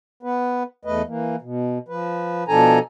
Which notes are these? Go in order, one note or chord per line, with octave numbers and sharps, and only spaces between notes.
B3 B4
E2 A3 B4 D#5
E3 A#3
B2
F3 B4
B2 F3 D4 A4 G#5 A#5